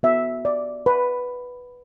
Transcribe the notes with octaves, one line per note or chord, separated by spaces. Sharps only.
B3 F#4 E5
D5
B4